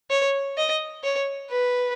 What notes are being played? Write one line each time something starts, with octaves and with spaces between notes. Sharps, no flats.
C#5
D#5
C#5
B4